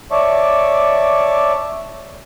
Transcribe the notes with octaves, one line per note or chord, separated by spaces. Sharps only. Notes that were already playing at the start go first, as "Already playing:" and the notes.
C#5 D5 E5 A5 C#6 D6